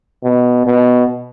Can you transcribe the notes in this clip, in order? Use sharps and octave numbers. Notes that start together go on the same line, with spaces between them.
B2
B2